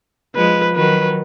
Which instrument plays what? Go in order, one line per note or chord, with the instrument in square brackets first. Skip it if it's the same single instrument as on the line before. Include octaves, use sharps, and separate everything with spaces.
[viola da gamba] F3 G#3 [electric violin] B4
[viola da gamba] D#3 F#3 [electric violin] B4